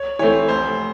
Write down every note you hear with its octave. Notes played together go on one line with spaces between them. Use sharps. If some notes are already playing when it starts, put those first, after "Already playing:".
Already playing: C#5
E3 A3 C4 C#5
F1 C5